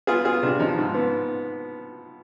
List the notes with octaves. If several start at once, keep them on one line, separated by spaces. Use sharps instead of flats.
B3 F4 G#4
B3 F4 G#4
C3 D4 F4
F3 D#4
G#2
B3